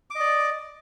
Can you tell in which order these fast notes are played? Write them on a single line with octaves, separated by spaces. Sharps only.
D6 D#5 D5